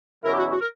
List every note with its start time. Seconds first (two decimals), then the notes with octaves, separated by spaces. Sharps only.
0.24 E2 B2 F#3 C#4 E4 A#4
0.33 G4
0.37 F#4
0.51 F#4
0.60 A#4